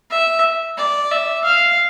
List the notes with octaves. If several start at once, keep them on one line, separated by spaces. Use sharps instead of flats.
E5
D5
E5
F5